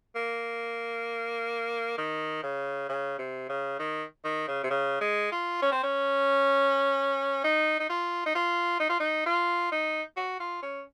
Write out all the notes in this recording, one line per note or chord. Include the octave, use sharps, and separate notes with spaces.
A#3
D#3
C#3
C#3
C3
C#3
D#3
D#3
C#3
C3
C#3
G#3
F4
C#4
C4
C#4
D#4
D#4
F4
D#4
F4
D#4
F4
D#4
F4
D#4
F#4
F4
C#4